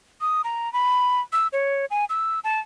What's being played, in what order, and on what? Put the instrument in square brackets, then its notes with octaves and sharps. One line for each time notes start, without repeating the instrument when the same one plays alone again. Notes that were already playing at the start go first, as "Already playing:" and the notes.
[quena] D#6
A#5
B5
E6
C#5
G#5
E6
A5